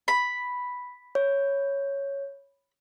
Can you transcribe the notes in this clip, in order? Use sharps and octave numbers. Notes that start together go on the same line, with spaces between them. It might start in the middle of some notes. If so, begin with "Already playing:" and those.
B5
C#5